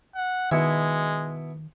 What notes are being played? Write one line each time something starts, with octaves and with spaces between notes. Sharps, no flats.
F#5
B2 D#3 G#3 E4